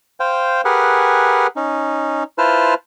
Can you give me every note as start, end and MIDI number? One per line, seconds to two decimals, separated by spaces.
0.20 0.61 72
0.20 0.61 77
0.20 0.61 79
0.65 1.47 67
0.65 1.47 68
0.65 1.47 70
0.65 1.47 71
0.65 1.47 78
0.65 1.47 80
1.56 2.23 61
1.56 2.23 63
2.38 2.74 64
2.38 2.74 65
2.38 2.74 71
2.38 2.74 72
2.38 2.74 81
2.38 2.74 89